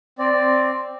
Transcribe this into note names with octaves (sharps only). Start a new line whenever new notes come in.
C4 D5
C4